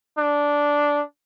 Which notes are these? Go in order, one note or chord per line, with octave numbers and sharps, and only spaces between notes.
D4